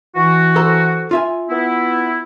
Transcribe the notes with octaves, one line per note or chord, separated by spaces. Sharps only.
E3 F#4
A4 C5 A#5
F4 E5 G#5
B3 E4